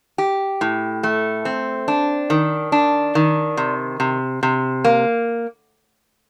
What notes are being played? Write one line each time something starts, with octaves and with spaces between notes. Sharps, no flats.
G4
A2
A3
C4
D4
D#3
D4
D#3
C3
C3
C3
A#3